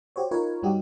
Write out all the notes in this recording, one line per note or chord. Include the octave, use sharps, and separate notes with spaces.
F#4 G4 C5 C#5
D#4 F4 A#4 B4 C#5
G2 G3 D#4 F#4 G4